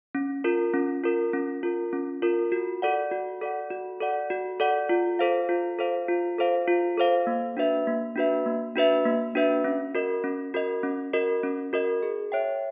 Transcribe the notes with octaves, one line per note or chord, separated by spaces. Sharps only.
C#4
F4 A#4
C#4
F4 A#4
C#4
F4 A#4
C#4
F4 A#4
F#4
A4 D5 F#5
F#4
A4 D5 F#5
F#4
A4 D5 F#5
F#4
A4 D5 F#5
F4
A4 C5 F5
F4
A4 C5 F5
F4
A4 C5 F5
F4
A4 C5 F5
A#3
D4 F#4 B4 E5
A#3
D4 F#4 B4 E5
A#3
D4 F#4 B4 E5
A#3
D4 F#4 B4 E5
C#4
F#4 A#4 D#5
C#4
F#4 A#4 D#5
C#4
F#4 A#4 D#5
C#4
F#4 A#4 D#5
G#4
C#5 E5 G5